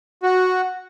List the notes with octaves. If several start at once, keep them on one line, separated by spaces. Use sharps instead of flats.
F#4